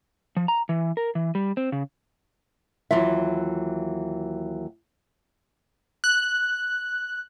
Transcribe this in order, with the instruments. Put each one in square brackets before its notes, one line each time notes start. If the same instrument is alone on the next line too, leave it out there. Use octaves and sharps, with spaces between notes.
[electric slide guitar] F3
A#5
E3
A#4
E3
G3
C4
C#3
[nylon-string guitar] D#2 E3 F#3 F4 E5
[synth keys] F#6